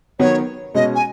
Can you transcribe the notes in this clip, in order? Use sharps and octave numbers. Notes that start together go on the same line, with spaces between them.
D#3 F#3 B3 C#5
B2 G#3 C#4 D#5
G#5